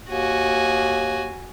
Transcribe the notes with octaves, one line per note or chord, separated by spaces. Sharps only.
D#2 F#4 G#5